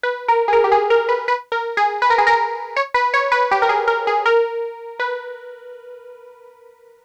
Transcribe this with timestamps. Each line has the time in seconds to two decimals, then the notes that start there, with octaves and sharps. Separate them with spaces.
0.03 B4
0.28 A#4
0.48 G#4
0.53 A#4
0.64 G4
0.72 G#4
0.90 A#4
1.09 B4
1.28 B4
1.52 A#4
1.77 G#4
2.02 B4
2.10 A#4
2.18 G#4
2.27 A#4
2.76 C#5
2.94 B4
3.14 C#5
3.32 B4
3.51 G4
3.62 A#4
3.69 G#4
3.88 A#4
4.07 G#4
4.26 A#4
4.99 B4